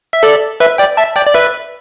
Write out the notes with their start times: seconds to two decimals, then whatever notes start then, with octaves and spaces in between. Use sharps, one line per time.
0.13 E5
0.23 A4 D5
0.60 B4 E5
0.78 D5 G5
0.97 E5 A5
1.16 D5 G5
1.27 D5
1.34 B4 E5